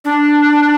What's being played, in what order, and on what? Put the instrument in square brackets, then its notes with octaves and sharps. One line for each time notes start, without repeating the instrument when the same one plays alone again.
[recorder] D4